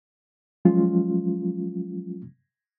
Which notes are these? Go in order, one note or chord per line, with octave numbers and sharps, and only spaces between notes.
F3 F#3 G#3 C#4 F4